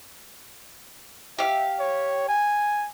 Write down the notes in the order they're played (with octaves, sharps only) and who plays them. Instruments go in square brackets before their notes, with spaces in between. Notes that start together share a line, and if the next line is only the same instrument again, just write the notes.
[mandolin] G4 F5 [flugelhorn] E5
[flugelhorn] C#5
G#5